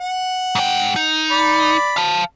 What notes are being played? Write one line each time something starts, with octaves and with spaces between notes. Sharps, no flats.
F#5
G#2 G5
D#4
D5 B5
F5 A5